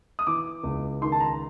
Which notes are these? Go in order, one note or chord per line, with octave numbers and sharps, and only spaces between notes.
D#6
E3 D6
C#2
D#3 C6
A5
A#5